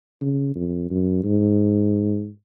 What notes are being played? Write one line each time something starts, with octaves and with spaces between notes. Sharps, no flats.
C#3
F2
F#2
G#2